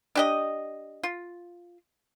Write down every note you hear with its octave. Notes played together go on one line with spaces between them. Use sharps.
D4 G4 D#5
F4